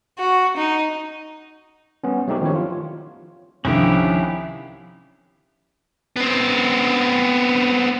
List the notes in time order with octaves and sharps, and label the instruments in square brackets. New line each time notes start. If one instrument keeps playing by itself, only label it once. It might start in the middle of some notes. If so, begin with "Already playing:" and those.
[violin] F#4
D#4
[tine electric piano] G3 B3 C#4
F#3 A3 C4 D#4 F#4 G4
D#3 F3 D4 E4 G4 C#5
F4
[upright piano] C2 D3 [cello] D#3 F3 [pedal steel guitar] C#4 E4 G4
[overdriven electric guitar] B3 C4